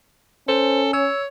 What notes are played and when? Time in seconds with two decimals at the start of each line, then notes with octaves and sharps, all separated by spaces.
0.48 C#4 A4 C5
0.93 C#5 E6